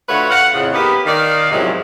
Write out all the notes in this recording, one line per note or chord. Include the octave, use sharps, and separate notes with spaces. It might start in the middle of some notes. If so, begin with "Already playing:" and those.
D3 A3 F4 F#4 B4 C#5
F5 F#5
F2 A2 C#3
A#3 B3 D#4 G4 A#4 B4
D#3 D5 F5
E2 G#2 C3 F3 F#3